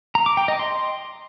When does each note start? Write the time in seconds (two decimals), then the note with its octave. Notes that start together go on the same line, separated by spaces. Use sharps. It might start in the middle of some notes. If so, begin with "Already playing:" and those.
0.15 A#5
0.26 D6
0.37 G5
0.48 D#5
0.59 C6